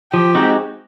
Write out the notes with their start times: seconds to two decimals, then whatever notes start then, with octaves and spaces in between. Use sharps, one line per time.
0.13 F3 G4
0.35 G#3 C4 D#4 F#4